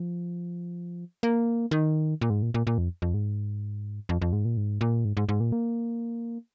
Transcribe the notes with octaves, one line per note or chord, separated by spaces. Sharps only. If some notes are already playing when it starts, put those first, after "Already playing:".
Already playing: F3
A#3
D#3
A#2
G#2
A#2
A#2
A#2
F2
F2
G#2
F2
F2
G#2
A#2
G#2
A#2
G#2
G#2
G#2
A#2
A#3